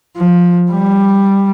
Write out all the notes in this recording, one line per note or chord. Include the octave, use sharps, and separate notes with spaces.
F3
G3